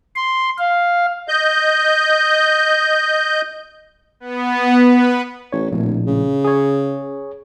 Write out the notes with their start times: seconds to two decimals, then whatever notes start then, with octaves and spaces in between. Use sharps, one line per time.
0.16 C6
0.58 F5
1.28 D#5 G6
4.20 B3
4.85 B4
5.52 A1 C#5
5.72 D1 A#1 A2
6.06 C#3
6.45 G#4 C#5